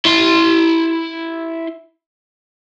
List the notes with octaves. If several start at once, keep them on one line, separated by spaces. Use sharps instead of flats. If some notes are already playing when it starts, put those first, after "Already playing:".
E4 C6